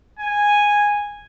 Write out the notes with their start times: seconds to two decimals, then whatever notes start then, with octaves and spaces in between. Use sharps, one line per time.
0.20 G#5